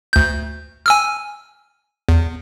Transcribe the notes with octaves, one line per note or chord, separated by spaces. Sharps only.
D2 G6
G#5 E6 F6
E2